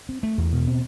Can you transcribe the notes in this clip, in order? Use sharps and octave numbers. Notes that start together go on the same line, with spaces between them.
C4
A3
E2
B2
C4